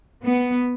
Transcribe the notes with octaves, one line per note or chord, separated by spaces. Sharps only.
B3